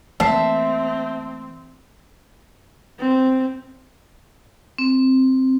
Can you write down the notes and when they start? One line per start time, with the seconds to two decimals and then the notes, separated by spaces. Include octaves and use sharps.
0.20 E3 A3 A#3 C4 E5 A5 C7
2.99 C4
4.78 C4